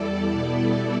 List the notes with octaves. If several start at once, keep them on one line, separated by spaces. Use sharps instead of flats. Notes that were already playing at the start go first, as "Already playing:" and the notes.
Already playing: E2 E3 G3 A4 D5
B2 G3 B3 E4